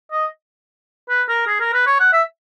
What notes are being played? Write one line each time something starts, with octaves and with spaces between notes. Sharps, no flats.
D#5
B4
A#4
G#4
A#4
B4
C#5
F#5
E5